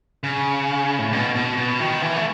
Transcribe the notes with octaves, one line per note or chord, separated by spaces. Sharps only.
C#3
A2
B2
B2
B2
D#3
E3
A3